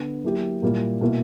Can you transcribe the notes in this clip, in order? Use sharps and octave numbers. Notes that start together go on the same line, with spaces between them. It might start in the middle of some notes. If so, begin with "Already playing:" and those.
Already playing: D3 B3
F#3 A#3 E4 G4
A#2 G3 A#3 E4
B2 A#3 E4